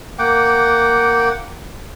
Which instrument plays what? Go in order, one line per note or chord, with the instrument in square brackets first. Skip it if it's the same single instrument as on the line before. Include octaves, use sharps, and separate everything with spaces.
[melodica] A#3 F#5 G5 D6